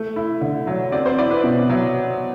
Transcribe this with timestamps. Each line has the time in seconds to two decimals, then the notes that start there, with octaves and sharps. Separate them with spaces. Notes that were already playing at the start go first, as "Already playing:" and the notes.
Already playing: A3
0.16 E4
0.41 D3
0.67 F#3
0.92 C4 D5
1.06 C5
1.18 E4 D5
1.31 B4
1.44 B2
1.69 F#3